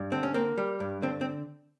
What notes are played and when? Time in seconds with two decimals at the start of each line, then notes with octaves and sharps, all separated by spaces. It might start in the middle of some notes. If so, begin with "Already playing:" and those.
Already playing: G2
0.12 D3 C4
0.23 C#4
0.34 A#3 C4
0.58 G3
0.80 G2
1.02 D3 C4
1.21 C4